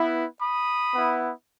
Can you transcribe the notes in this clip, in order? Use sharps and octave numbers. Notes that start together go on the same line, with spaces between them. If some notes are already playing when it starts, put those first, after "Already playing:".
Already playing: B3 E4
B5 D#6
B3 E4